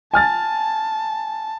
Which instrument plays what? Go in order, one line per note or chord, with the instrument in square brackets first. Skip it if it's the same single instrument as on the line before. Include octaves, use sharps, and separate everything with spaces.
[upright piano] G#5 F6 A6 [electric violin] A5